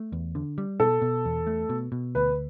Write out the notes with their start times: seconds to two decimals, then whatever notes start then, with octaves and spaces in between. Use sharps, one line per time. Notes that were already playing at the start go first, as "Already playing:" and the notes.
Already playing: A3
0.12 E2
0.35 D3
0.58 G3
0.80 B2 A4
1.02 B2
1.25 E2
1.47 A3
1.69 B2
1.92 B2
2.15 D2 B4